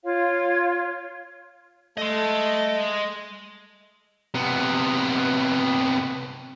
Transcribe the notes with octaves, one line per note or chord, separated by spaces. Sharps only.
F4 C#5 F5
A3 D#5 C6
C3 B3